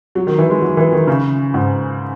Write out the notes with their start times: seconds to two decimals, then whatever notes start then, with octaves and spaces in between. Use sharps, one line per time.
0.15 F#3
0.27 D#3
0.38 E3
0.50 G#3
0.61 F#3
0.77 E3
0.92 D#3
1.07 C#3
1.54 G#2